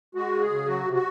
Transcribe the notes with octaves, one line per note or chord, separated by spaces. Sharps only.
G#3 F#4
C#3
G#4
C#3
F#3 F#4
C3
F#4